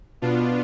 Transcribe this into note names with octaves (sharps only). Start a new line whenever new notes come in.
B2 B3 D4 F4